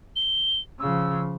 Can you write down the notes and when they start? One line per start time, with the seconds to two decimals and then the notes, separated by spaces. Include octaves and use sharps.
0.16 G7
0.80 C#3 F3 E6